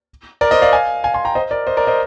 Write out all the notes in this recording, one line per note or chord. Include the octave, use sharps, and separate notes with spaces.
A#4 D5
C5 D#5
D5 F5
F5 G#5
F5 G#5
G#5 C6
G5 A#5
C5 D#5
A#4 D5
C5 D#5
A#4 D5
C5 D#5